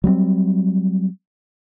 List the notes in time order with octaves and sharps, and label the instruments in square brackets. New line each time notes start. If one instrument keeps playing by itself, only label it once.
[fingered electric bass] F#3 G3 A#3 C4